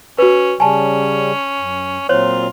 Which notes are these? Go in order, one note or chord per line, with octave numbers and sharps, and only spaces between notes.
C#4 F#4 B4
C#3 G3 C#4 G#5 A5
F#2
A#2 F#3 C4 F4 C5 C#5